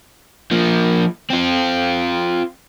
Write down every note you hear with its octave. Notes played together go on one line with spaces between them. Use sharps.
F3 A#3
C4 F4